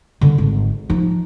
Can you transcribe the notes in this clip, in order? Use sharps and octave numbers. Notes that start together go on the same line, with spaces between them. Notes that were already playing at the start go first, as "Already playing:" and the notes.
D3 G3
G#1
F3 D#4